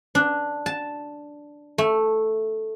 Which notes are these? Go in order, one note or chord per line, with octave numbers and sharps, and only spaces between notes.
D4
A5
A3